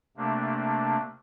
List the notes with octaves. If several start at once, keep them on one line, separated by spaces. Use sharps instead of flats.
C3 A3 A#3 D4